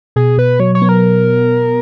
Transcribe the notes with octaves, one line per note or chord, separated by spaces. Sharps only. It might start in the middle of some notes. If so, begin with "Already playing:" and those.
B2 G#4
B2 B4
F#3 C#5
C#5
B3
A#4